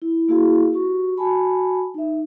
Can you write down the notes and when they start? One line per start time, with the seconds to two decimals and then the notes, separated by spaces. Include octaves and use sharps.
0.02 E4
0.28 A#3 E4 F#4 G#4 F5
0.73 F#4 G4 C#6
1.18 F#4 G#5 A5 B5
1.94 D#4 E5